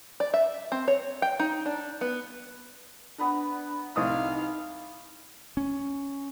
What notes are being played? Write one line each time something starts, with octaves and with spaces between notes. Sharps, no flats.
D5
E5
C4
C#5
G5
D#4
D4
B3
B3 D4 B4 A#5
C2 D#4 F5 D#6
C#4